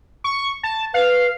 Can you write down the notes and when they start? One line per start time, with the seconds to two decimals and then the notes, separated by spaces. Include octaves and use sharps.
0.24 C#6
0.63 A5
0.94 B4 F5